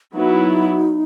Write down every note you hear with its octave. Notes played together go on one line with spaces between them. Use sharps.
F#3 B3 D#4 E4